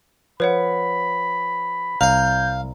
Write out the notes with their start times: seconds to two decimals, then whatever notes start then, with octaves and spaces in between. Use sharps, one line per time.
0.40 F3 B4 C#5 F#5 B5
2.01 C2 F5 A#5 G6